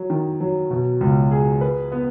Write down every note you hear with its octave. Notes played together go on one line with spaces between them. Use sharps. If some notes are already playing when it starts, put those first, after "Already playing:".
Already playing: F#3
D#3
F#3
B2
C#2
G#4
B4
B3